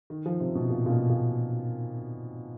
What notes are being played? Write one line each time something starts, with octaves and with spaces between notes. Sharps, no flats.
D#3
F3
C3
B2
A#2
A#2
B2
A#2